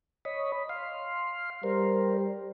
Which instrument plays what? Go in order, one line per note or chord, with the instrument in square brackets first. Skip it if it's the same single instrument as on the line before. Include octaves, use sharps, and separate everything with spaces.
[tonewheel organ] C#5 D#5 B5
F5 C6
[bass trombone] G3 [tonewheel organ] A#4 C5